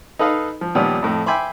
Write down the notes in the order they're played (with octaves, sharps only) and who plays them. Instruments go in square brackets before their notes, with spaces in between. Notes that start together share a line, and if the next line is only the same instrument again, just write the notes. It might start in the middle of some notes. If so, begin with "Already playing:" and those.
[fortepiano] D#4 A4 B4 D#5 F5
F3
A#2 D#3 F3 G3 B3 C#4
F2 A2
E5 G5 G#5 B5 C6 D6